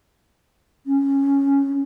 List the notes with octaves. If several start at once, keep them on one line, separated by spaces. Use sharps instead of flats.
C#4